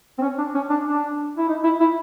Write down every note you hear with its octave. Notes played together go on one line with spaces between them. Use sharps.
C4
C#4
D4
C#4
D4
D4
E4
D#4
E4
E4